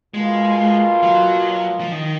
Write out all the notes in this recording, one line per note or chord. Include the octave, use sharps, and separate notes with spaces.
B2 G#3 A#3 F4
F#3
F3
D#3